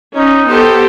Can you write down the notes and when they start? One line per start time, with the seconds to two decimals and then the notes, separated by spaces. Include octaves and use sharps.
0.15 C#4 D#4
0.48 B3 G4 A4 C5